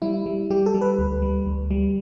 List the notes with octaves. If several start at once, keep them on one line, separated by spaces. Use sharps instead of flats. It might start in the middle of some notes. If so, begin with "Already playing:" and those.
G3 E4
G3
G3 G4
A4
G3
B4
D2
G3
D2
G3